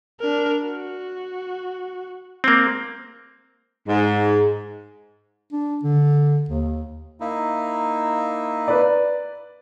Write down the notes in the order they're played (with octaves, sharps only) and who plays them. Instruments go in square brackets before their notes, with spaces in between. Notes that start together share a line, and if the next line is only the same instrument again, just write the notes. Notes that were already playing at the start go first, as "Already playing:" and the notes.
[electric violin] D4 A#4
F#4
[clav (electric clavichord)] A#3 C4
[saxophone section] G#2
[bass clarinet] D4
D3
D#2
[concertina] A#3 D#4 E4
[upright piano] B4 D5